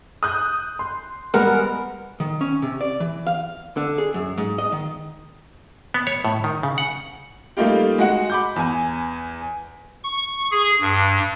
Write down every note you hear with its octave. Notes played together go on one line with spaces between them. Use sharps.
D#6 F#6 G6
C6
G3 G#3 B3 A#4 F#5
D#3
C#4
C3
D5
E3
F5
D3
G#4
F#2
G#2
D#5
D#3
B3
C#5
A2
D#3
C#3
F#5
G3 A3 A#3 D#4 F4 G4
G#3 F#4 F#5
B5 D6 G6
E2 G#5
C#6
G#4
G2